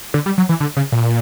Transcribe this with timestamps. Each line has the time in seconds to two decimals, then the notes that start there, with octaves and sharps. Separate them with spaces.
0.14 D3
0.26 G3
0.38 F#3
0.49 E3
0.60 D3
0.77 C#3
0.92 A#2